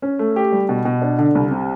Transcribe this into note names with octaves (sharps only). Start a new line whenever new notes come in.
C#4
A3
G4
G3
B2
B2
D4
D3
C2
C3